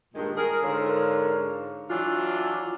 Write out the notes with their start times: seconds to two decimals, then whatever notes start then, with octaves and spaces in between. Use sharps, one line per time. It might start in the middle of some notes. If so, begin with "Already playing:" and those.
0.15 G2 A#2 D#3 G#3
0.37 G#4 A#4
0.63 G#2 D3 F4 A#4 C#5
1.89 E3 F#3 D4 F4